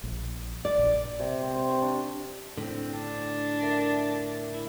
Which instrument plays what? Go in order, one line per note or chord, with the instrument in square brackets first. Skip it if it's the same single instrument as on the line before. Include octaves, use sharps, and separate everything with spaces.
[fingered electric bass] A#1
[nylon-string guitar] D5
[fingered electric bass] A#1
[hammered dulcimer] C3
C4
C5
C#6
D4
[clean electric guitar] A2 D3 [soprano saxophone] C4
[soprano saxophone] D4
[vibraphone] A#4 E5
[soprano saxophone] E4